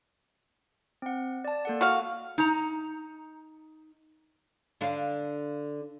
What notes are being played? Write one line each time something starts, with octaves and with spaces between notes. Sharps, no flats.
C4 F#5
D5 A5
A#3 A4 F#5
F#4 F5
D#4 A#5
D3 D4 F5